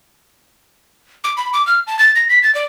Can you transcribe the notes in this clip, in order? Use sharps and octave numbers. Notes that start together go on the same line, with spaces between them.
D6
B5
D6
F6
A5
A6
A#6
B6
A6
D5